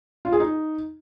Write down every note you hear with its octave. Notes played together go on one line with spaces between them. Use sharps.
F4
G#4
D#4